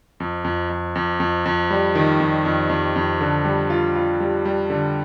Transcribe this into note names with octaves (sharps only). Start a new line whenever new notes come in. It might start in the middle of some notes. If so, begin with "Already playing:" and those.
F2
F2
F2
F2
F2
F2
G3
D#3
F2
F2
F2
F2
D3
G3
F4
F4
G3
G3
D3